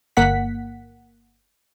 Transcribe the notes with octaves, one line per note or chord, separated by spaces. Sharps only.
G1 A#3 F#5 B6